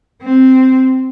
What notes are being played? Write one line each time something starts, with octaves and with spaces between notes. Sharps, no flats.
C4